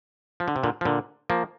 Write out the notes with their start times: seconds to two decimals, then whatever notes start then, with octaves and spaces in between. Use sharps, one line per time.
0.40 F3
0.48 D3
0.56 C3
0.63 A#2 D3
0.81 F3
0.85 A#2 D3
1.30 F3 A#3